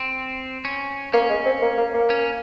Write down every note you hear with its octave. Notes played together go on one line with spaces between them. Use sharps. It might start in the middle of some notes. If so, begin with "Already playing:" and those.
Already playing: C4
C#4
A#3 C#4
G#3
C4
A#3
A#3
A#3
C#4